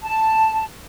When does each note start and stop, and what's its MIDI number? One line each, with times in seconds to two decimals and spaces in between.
0.03 0.63 81